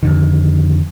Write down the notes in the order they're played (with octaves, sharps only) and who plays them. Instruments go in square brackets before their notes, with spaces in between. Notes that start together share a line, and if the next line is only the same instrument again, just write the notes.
[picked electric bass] F2 D3 D#3